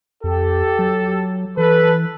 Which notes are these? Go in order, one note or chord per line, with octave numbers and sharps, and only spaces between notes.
F2 G4 A4
F#3
E3 A4 B4